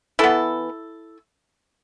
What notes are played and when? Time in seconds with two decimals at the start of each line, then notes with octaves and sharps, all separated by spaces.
0.19 E3 B3 E4 A4